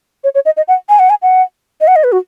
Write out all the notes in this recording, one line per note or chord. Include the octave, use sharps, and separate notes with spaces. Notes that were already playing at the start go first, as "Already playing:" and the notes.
C#5
C#5
D#5
D#5
F#5
G#5
F#5
G#5
F#5
D#5
F#5
D#5
B4
F#4